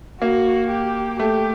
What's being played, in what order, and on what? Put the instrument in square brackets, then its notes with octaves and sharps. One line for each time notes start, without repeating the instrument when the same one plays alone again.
[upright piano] A#3 [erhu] F#4
[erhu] G4
[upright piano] A3 [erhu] G4